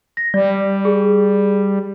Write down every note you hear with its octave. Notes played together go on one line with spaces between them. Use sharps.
A#6
G3 D5
G#4